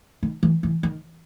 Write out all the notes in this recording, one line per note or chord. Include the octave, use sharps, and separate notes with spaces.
D#3
E3
E3
D#3